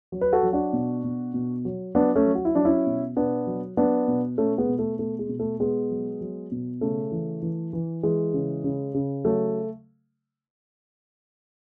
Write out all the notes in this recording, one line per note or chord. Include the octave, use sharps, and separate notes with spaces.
F#3
B4
F#4 A4
F#3
D4 F#4
B2
B2
B2
F#3
F#3 B3 D4
A3 C#4
F#3
F#4
E4
F#3 D4
C#4 E4
B2
B2 B3 D4
F#3
F#3 B3 D4
B2
B2 A3 C#4
G#3 B3
B2
A3
B2 A3
G#3
B2
A3
B2 G#3 B3
F#3
F#3
B2
C#3 A3
E3
E3
E3
E3 G#3
C#3
C#3
C#3
F#3 A3